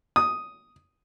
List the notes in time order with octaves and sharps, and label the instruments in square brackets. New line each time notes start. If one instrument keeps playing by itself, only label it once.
[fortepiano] D#6